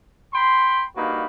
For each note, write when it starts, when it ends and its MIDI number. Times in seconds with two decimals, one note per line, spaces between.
0.33 0.83 79
0.33 0.83 83
0.33 0.83 84
0.96 1.25 43
0.96 1.25 58
0.96 1.25 63
0.96 1.25 66
0.96 1.25 83